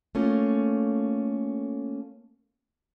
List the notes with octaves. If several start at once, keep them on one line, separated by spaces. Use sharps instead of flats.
A3 A#3 C#4 F4